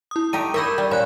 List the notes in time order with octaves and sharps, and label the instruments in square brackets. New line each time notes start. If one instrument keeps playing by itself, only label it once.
[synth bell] E4 D#6
[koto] A3 D#4 G4 [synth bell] D#7
[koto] E4 D#5 E5 [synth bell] A#4 C#6 G6
[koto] G3
[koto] A#2 C#4 [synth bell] B5 F#6